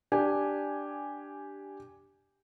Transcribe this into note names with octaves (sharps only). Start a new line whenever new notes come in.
D4 G4 G#5